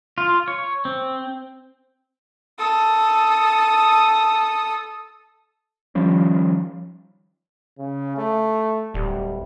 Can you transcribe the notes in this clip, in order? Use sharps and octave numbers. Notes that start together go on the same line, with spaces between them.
F4
C#5
C4
A4 D#6
D#3 F3 G3 C#4
C#3
A3
D1 G3